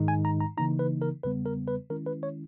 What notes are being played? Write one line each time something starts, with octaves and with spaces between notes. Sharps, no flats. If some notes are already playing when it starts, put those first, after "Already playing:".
Already playing: G#2 D#3 G#3 D#4
G#5
A#5
A#5
C#3 E3 A#3 D#4 A#5
B4
A#4
E2 C#3 G3 B3 B4
A#4
B4
D#3 G#3 C#4 E4 A#4
B4
C#5